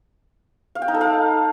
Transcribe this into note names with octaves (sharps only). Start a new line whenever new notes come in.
F5
G5
D#4
A4
F5